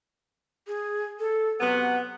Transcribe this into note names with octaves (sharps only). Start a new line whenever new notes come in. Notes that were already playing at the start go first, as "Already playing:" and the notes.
G#4
A4
C3 F#3 B3 F#5